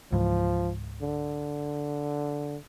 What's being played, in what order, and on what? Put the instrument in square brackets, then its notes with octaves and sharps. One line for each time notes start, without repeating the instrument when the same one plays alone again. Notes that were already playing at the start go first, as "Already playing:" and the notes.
[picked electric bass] C#2 G#2 E3 [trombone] F3
[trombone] D3